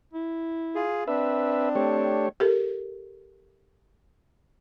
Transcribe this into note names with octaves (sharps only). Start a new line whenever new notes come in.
E4
F4 G#4
C4 D4 B4 E5
A3 G4 C#5
G4 A4 A#4